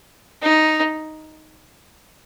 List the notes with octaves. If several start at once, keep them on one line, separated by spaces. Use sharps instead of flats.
D#4